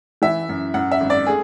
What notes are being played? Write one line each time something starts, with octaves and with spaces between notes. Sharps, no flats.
E3 E5
F#2
F#2 F#5
E5
G#1
D5
A3 G#4